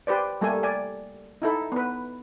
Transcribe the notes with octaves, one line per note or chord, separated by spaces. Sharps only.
G4 B4 C5 D5
G3 A3 A#3 G4 A4 G#5
D5 G#5
D#4 E4 A4
B3 B4